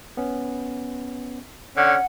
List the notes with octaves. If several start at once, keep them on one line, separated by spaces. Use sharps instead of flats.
B3 C#4
D3 C#4 F#5